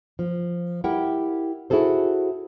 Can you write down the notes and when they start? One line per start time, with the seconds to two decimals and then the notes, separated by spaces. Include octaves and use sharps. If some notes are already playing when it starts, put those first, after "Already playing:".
0.19 F3
0.84 E4 G4 A#4 F#5 G5
1.70 E4 F#4 G#4 A4 C5